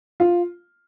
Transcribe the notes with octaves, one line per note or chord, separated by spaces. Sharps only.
F4